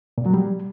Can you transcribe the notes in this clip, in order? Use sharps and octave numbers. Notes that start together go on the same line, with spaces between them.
A#2
F#3
G3